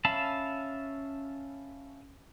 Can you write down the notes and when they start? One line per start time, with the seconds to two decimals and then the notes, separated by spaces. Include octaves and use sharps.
0.05 C#4 E5 F5 A5 B5